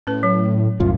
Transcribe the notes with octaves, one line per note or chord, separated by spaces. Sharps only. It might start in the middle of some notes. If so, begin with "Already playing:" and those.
A2 C#4 B4
F#3
C2 F#2 A2 F4